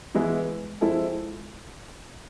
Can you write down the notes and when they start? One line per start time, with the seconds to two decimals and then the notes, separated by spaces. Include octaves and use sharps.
0.14 E3 G#3 B3 E4
0.81 F3 G#3 C4 E4 A4